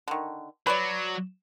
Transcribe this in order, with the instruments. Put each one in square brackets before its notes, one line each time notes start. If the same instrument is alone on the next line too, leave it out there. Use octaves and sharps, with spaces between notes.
[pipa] D3 D#3
[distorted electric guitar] F#3 [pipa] B4 C#5 D5